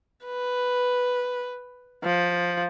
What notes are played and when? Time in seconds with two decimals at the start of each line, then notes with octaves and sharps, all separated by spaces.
0.25 B4
2.04 F3